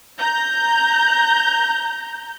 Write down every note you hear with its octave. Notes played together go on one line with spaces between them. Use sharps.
A#5 G6